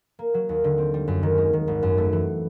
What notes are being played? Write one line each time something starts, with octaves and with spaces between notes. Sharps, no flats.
A#3
F#3
D#2
D3
C4
G3
F#2
D#3
G#3
D#3
G#1
F#2
A3
E3